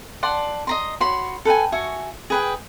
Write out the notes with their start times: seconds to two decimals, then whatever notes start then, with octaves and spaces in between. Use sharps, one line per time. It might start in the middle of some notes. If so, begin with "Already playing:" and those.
0.23 D5 F#5 A5 C6
0.67 D#5 A#5 C6
1.00 F#4 C#5 B5 C6
1.45 A4 B4 G5 G#5
1.72 F#4 E5 G#5 C#6
2.30 G#4 B4 G5